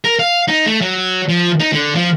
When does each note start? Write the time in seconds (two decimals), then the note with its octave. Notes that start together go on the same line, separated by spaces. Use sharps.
0.04 A#4
0.19 F5
0.48 D#4
0.66 A3
0.81 F#3
1.29 F3
1.60 D#4
1.73 D3
1.96 F3